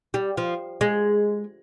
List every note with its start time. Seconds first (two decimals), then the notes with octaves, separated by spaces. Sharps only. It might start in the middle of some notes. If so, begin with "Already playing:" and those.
0.14 G3
0.37 F3
0.81 G#3